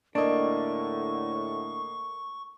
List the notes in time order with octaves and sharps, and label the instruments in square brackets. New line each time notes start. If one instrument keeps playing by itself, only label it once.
[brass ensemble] A2 D3 [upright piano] A#3 D#5 [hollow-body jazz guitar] D4 [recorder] C#6